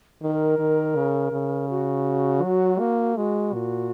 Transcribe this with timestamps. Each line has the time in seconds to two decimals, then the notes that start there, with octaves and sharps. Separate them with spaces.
0.22 D#3 A#4
0.59 D#3
0.96 C#3
1.32 C#3
1.69 F#4
2.43 F#3
2.80 A#3
3.16 G#3 F#4
3.54 A#2